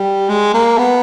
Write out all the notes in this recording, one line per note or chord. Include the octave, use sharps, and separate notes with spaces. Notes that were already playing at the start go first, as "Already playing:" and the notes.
Already playing: G3
G#3
A#3
B3